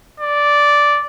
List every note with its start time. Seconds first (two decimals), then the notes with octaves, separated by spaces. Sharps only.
0.20 D5